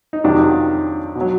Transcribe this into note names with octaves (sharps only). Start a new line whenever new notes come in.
D#4
F2 C3 D#3 F#3 D4
B2
F#3